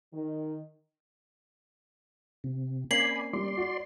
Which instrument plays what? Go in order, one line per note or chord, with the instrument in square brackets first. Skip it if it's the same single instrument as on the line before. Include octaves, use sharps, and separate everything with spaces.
[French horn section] D#3
[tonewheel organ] C3
[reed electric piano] A#3 C4 C#4 [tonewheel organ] D5 G#5 B5 [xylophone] C7 F#7
[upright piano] G3 [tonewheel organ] D5 C6
[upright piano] F#4